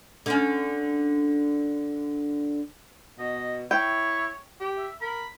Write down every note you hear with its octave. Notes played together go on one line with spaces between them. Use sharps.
D3 C#4
B2 D#5
E4 C#5 G5
G4
E5
A#4 B5